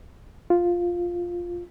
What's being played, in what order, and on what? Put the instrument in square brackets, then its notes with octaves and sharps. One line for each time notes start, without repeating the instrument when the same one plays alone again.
[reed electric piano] F4